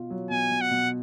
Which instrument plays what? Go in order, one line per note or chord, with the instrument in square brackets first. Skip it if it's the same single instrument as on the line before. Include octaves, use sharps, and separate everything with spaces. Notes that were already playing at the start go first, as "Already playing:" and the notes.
Already playing: [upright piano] B2 F4
F#3
[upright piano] B2 [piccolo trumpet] G#5
[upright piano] B2
[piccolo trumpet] F#5
[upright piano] B2